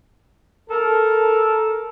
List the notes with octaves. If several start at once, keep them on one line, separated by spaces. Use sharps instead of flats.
A4 A#4